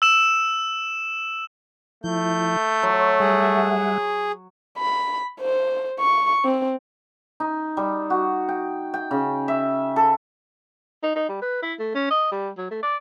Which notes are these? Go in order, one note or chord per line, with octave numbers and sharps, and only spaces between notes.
E6 E7
F3 A3 E4 G6
F#3 C#5 C6
G3 G#4 E5 F#5
B5
C5
C#6
C4
D#4
G3
F#4
G5
G5
C#3
E5
A4
D#4
D#4
G3
B4
E4
A3
C#4
D#5
G3
F#3
A3
D5